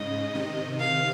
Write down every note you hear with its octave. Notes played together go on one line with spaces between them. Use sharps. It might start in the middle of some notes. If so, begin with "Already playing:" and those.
Already playing: G#2 C#3 D#5
C3 D#3
C3 D#3 F5